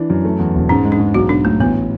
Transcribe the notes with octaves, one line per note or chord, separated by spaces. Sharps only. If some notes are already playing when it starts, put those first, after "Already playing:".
Already playing: E3 D4
F#2
A3
E2
E1
G#2 C#4
G#3
D4
G#2
B1 F#4
B2 D4
B1 A3
A1 B3